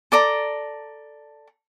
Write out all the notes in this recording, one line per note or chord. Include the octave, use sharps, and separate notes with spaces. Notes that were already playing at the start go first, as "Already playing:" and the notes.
A4 D5 A#5